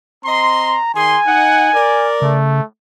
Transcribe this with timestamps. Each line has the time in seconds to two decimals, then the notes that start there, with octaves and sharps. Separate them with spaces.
0.25 C4 D#5 A#5 C6
0.95 D#3 G#4 G#5 C6
1.27 D#4 F#5
1.74 A#4 D5
2.22 C#3 A3